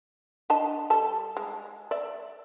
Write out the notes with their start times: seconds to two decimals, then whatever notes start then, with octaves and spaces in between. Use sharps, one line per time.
0.50 D4 D#5 A5
0.90 G3 A4 A5
1.37 G#3
1.91 D5 E5